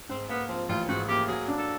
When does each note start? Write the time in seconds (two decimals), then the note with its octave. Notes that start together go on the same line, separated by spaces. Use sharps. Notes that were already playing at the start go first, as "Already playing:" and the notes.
0.09 G#2 C4
0.29 A#3 B3
0.49 F3 C4
0.69 A1 F4
0.89 G#2 F#4
1.08 A#3 G4
1.28 F#3 G#4
1.48 D4
1.58 A4